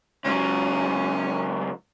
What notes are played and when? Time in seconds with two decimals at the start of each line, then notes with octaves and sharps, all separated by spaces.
0.25 C#2 F#3 C#4